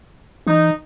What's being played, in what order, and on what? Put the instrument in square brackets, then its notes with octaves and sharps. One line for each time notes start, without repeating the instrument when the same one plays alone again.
[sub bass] E3 [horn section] D#4